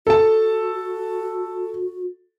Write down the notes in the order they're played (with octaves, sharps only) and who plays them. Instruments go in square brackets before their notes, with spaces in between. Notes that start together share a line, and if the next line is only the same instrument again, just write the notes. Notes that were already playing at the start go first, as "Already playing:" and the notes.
[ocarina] F#4 [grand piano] A4 A5